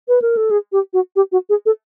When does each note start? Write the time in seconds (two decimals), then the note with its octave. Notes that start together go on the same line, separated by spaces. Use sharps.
0.08 B4
0.22 A#4
0.37 A4
0.51 G#4
0.72 G4
0.93 F#4
1.16 G4
1.32 F#4
1.49 G#4
1.66 A4